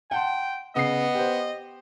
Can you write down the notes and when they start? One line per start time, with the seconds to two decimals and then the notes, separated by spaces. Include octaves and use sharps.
0.11 F#5 G5 A5 C6
0.76 C#3 B3 D#5 C7
1.14 G4 C5